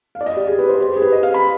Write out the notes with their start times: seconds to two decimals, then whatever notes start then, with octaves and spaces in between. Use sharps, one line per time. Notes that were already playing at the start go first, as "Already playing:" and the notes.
0.15 F5
0.21 D5
0.26 D#5
0.37 G4
0.48 G#4
0.59 B4
0.69 C5
0.80 G4
0.96 G#4
1.02 B4
1.12 D#5
1.23 F5
1.34 B5